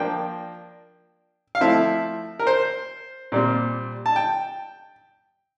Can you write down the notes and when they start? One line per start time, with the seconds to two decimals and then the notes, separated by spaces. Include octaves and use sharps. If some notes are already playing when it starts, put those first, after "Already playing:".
Already playing: F3 A#3 D4 G5
1.55 F5
1.61 F3 A3 C4 E4 E5
2.39 A#4
2.47 C5
3.32 A#2 G3 C4
4.06 A5
4.16 G5